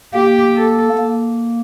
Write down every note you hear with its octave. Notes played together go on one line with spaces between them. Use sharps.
A#3 G4
A4
A#3